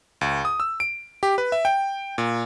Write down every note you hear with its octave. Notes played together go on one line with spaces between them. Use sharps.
C#2
D#6
E6
D7
G4
B4
E5
G5
A#2